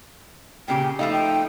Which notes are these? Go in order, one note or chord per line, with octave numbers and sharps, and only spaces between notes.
A#2 C#3 G4 G5
F3 A3 D#4 F5
G5